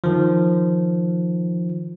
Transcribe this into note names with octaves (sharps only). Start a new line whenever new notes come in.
D#3 F3